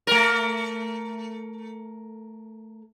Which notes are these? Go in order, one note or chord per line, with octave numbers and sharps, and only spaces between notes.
A3 A#4